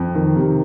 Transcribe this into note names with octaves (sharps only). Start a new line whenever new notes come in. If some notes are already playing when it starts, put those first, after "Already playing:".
Already playing: F2
D#3
C3